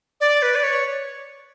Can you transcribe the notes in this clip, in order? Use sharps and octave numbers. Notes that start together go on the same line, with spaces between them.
D5
B4
D5
C#5